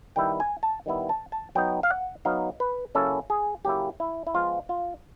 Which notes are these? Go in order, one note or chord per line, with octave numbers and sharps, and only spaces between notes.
D#3 G3 B3 E4 G5
G#5
A5
D#3 G3 B3 E4
A5
A5
F#3 B3 D#4 G5
F5
F#5
F#3 B3 D#4 F5
B4
C#3 F#3 A#3 C#4 E4 A4
G#4
C#3 F#3 A#3 C#4 E4 G4
E4
E4
F3 G#3 B3 F4
F4